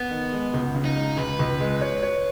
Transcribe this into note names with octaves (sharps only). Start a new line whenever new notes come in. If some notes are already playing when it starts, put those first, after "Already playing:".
Already playing: B3
D#3
G#3
C#2
C#3
D#4
G#3
C#2 B4
C#2
G#3
C#5
C#5